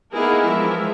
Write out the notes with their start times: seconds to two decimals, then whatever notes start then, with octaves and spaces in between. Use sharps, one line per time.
0.13 A#3 B3 D#4 E4 G#4 A#4
0.46 E3 F3 G#3 A#4 E5